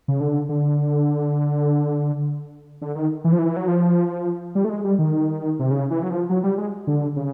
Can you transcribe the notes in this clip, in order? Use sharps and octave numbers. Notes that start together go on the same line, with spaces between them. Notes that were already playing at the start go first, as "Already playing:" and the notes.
C#3
D3
D3
D3
D#3
E3
F3
E3
F#3
F3
G3
A3
G#3
G3
D#3
C3
C#3
E3
F#3
F3
F#3
G3
G#3
D3
C#3